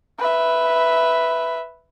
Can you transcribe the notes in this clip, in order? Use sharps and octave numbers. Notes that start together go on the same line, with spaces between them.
B4 E5